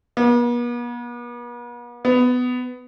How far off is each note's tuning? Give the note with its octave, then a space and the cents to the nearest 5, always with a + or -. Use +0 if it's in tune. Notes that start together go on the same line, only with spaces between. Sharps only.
B3 -45
B3 +15